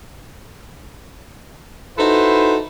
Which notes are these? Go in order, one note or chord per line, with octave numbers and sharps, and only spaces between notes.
D#4 E4 F#4 A4 B4 C5